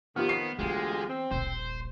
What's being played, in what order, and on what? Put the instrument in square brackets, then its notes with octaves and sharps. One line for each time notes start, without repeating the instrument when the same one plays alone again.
[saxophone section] D#3 F3 [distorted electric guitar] B3 [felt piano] F4 G4 F6
[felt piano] C7
[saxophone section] D2 F4 G4 [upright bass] E3 B3 [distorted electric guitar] G#3
[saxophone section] C4
[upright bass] D#1 A#1 [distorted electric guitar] C5